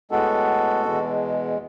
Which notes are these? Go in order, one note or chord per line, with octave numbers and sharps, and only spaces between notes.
A2 G#3 B3 F#4 A4
E2 B2 G#3